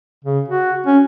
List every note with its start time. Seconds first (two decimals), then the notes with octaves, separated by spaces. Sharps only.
0.24 C#3
0.48 F#4
0.87 C#4